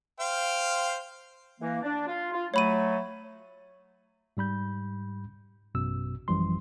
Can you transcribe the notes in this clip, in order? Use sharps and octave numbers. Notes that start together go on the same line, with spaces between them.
C5 F5 G5
E3 A#3
D4
F4
F4
F#3 A3 C#5 B5 D#7
G#2 G3 B5 G6
A1 F#2 B2 E6
A1 F#2 E3 F3 G3 C6